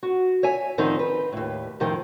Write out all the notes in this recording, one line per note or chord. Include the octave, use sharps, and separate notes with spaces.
F#4
C#5 E5 G#5
D2 A2 D#3 F3 C4 D#4
B4
D#2 A2
F2 A2 C3 D#3 F3